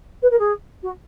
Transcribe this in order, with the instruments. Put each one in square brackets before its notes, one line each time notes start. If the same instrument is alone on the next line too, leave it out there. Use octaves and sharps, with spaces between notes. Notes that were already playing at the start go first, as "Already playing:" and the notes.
[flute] B4
A#4
G#4
F#4